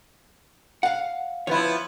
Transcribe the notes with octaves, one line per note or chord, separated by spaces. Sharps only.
F5 F#5
F3 B3 E4 C#5